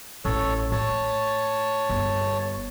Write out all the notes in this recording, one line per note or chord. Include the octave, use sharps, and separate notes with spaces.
A1 A4 C#5
A2 C#5 A5
G1